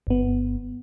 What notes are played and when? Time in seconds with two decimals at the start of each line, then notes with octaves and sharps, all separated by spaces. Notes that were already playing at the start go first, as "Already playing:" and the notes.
0.07 G1 B3